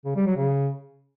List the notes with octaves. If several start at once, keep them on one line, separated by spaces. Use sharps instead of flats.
C#3
G3
F#3
C#3